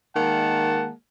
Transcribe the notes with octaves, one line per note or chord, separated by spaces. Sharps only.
D#3 G#3 A#3 F#5 A5